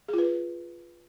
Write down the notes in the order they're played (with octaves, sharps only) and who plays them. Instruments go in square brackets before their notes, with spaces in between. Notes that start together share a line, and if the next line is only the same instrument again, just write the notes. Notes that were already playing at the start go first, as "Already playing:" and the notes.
[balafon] G#4
F4
B4